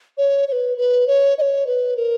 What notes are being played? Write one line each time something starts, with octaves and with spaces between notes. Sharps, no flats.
C#5
C#5
B4
B4
C#5
D#5
C#5
B4
A#4